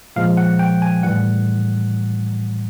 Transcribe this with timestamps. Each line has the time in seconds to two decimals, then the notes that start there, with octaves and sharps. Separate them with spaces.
0.16 A#2 F3 G#3 F5
0.37 F#5
0.59 G5
0.82 G#5
1.03 A2 E3 G3 F#5